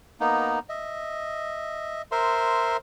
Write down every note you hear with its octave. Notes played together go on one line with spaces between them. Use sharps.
A#3 B3 D#4
D#5 E5
A#4 C5 E5 C6